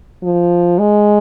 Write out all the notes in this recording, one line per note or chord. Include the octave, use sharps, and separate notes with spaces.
F3
G#3